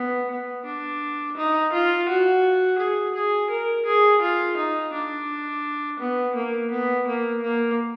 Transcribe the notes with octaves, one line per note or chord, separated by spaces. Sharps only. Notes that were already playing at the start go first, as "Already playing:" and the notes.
Already playing: B3
B3
D4
D#4
F4
F#4
G#4
G#4
A#4
G#4
F4
D#4
D4
B3
A#3
B3
A#3
A#3